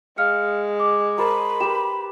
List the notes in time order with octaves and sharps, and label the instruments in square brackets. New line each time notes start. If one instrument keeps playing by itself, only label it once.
[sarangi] G#3 [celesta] F5 F6 C#7
[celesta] D6
[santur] A#4 C5 A5 [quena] B5
[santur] G4 B4 [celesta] E7